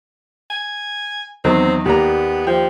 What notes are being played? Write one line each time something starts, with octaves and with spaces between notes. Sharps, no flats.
G#5
E2 D#3 F#3 C4
D#2 A#3 B3 G4 D5 A#5
F3 G5